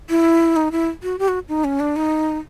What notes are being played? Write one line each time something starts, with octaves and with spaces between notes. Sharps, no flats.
E4
D#4
E4
F#4
G4
F#4
D#4
C#4
D4
D#4